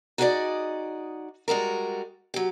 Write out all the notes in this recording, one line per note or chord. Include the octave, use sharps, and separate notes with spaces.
D#4 F#4 G#4 B4 D5 D#5
G3 G#3 F#4 A#4
F#3 G4